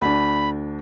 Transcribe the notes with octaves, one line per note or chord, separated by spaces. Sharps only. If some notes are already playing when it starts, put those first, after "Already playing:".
D2 D4 B5